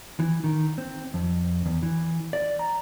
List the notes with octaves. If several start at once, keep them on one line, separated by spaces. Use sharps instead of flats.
E3
D#3
C4
F2
E2
E3
D5
A#5